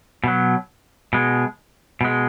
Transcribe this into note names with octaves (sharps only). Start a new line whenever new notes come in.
B2 F#3
B2 G#3
B2 G#3